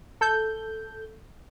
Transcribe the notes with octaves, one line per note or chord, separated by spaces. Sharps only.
A4 G6